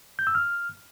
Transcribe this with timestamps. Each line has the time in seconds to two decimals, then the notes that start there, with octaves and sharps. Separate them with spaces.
0.19 G6
0.27 E6
0.35 F6